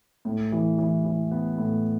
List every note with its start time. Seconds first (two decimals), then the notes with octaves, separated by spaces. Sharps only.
0.25 A2
0.52 E3
0.78 E3
1.05 E3
1.31 B3
1.58 A2